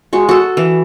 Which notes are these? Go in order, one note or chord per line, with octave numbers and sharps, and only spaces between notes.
G#3 F#4
F#4 A4
E3